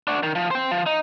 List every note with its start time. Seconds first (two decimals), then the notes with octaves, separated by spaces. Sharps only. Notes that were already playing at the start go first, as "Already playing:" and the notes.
0.08 D4 F#4
0.23 D#3
0.35 F3
0.51 C5 G5
0.71 F3
0.86 D#4